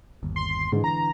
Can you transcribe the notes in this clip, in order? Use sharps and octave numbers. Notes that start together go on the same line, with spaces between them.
G1 D#2
C6
G#2 D3 E3
A#5